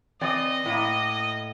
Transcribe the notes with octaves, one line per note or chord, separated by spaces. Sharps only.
E3 C4 D5 D#5
A2 A#3